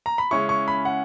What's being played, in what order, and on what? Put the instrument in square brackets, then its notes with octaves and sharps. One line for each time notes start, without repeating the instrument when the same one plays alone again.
[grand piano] A#5
B5
C#3 G#3 C#4 E4 C#6
C#6
B5
F#5